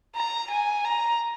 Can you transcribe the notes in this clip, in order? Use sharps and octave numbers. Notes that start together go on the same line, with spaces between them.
A#5
G#5
A#5